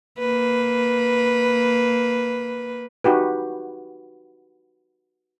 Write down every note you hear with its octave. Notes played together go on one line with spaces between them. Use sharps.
A#3 B4
D#4 F#4 G4 B4